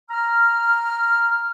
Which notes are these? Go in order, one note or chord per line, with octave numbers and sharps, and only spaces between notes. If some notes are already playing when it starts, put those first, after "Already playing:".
A#5 F6